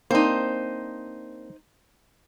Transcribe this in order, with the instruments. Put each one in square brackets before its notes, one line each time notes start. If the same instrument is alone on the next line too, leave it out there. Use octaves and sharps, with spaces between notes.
[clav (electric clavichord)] A#3 C4 D4 [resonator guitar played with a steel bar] D#4 C5